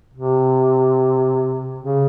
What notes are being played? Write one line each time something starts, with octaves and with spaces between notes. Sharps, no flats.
C3
C#3